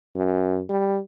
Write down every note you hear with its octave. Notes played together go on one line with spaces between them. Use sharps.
F#2
G3